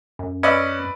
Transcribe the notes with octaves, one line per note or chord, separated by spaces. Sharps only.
F#2
C#4 B4 D5 D#5 E6